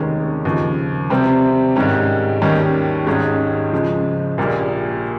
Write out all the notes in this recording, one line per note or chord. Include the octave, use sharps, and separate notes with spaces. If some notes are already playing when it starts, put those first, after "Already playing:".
Already playing: F1 D#2 D#3 G#3 C#4
D#2 C#3 F3
C3 G3 C4
G#2 D#3 G3 C#4
D#2 D#3 G3 C#4
G#1 G#2 G3 C#4 G#4
C#3 F3 G#3
A#1 A#2 G3 A#3